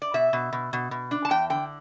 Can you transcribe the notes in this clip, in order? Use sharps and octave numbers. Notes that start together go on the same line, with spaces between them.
D5
B2 E5
B2
B2
B2
B2
D4
A5
E2 G5
D3 G5